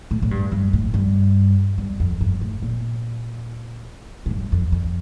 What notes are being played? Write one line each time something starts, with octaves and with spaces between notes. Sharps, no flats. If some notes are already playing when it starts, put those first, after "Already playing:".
A2
A2
G2
G2
A2
G2
G2
F2
G2
A2
A#2
A2
G2
F2
F2